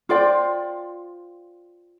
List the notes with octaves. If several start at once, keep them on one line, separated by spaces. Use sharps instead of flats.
F4 C5 D5 G5